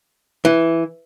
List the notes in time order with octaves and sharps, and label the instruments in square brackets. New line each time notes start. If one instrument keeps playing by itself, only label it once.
[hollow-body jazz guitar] E3